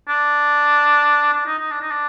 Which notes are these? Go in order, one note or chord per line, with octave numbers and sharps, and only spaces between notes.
D4
D4
D#4
D#4
D4
D#4
D4